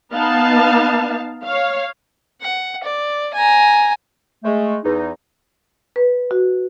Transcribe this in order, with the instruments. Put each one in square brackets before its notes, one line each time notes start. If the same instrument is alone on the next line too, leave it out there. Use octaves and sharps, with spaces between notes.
[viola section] B3 D#4 F5 A5
C#5 F5
[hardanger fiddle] F#5
D5
G#5 A#5
[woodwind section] G#3 A3
E2 D#4
[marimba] B4
F#4